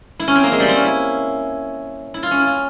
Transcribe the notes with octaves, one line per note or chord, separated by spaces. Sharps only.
E4
C#4
C4
A#3
G#3
G3
C4
C#4
E4
E4
F4
C#4
E4
F4